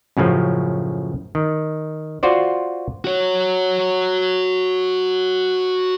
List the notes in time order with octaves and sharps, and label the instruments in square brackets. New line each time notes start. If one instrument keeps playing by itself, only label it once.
[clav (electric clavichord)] F#2 A2 C#3 F3
D#3
F4 F#4 C5 D5
[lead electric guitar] F#4 C#5